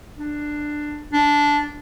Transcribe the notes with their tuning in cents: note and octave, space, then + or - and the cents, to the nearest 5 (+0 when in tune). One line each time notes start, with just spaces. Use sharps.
D4 +10
D4 -10